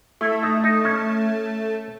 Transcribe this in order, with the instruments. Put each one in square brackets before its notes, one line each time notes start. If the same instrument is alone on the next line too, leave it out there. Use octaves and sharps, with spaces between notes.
[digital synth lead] A3 [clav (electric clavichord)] E4
[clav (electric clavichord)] D#4
D#4
C#4